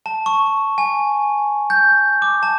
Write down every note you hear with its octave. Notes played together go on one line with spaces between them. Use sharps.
A5
C#6
G#5
G6
D6
A5